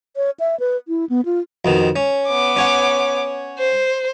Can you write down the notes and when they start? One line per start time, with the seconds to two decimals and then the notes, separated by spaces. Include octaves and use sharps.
0.16 C#5
0.40 E5
0.60 B4
0.88 E4
1.09 B3
1.25 F4
1.65 F2 B2 D#3
1.96 C#4
2.27 B3 D6
2.57 C#4 C#5 F#5
3.59 C5